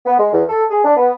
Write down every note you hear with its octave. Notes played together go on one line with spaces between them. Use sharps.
B3
G#3
E2
A4
G#4
D4
B3